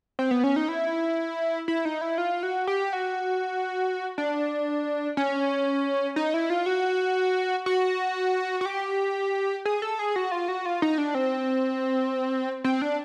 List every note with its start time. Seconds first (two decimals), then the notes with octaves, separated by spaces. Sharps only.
0.19 C4
0.31 B3
0.44 C#4
0.56 D#4
0.69 E4
1.68 E4
1.85 D#4
2.01 E4
2.18 F4
2.43 F#4
2.67 G4
2.93 F#4
4.18 D4
5.17 C#4
6.16 D#4
6.34 E4
6.50 F4
6.66 F#4
7.66 F#4
8.61 F#4
8.66 G4
9.65 G#4
9.82 A4
9.99 G#4
10.16 F#4
10.32 F4
10.48 F#4
10.66 F4
10.82 D#4
10.98 D4
11.15 C4
12.64 C4
12.82 D4